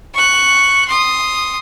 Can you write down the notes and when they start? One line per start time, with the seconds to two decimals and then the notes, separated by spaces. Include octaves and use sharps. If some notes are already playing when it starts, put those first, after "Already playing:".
0.14 C#6 F#6
0.88 C6 D#6